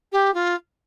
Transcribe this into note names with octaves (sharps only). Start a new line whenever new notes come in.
G4
F4